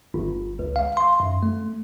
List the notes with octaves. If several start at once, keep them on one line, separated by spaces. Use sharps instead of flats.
G1
C#2
F5
C6
F#2
A3